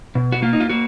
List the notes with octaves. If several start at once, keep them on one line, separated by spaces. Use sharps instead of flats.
B2
F#4
A#3 F4
D#4
F4
A#3 F#4